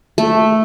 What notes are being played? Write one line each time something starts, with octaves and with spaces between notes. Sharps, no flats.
A3